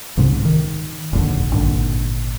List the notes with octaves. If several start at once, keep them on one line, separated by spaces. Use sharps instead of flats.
C2 G#2 C#3
D#3
F1 A#1 D#2 D3
G#1 G2 A#2 D3